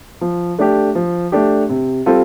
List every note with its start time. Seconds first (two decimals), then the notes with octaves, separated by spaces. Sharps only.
0.21 F3
0.59 A3 D4 G4
0.95 F3
1.32 A3 D4 G4
1.69 C3
2.06 G3 C4 F4 A4